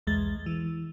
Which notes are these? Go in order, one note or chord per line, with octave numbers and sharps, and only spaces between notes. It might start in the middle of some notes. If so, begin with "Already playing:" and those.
B1 E2 G#3 A6
E3